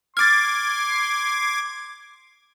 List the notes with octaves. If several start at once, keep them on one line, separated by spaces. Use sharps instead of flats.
C6 D6 F6 G#6 A6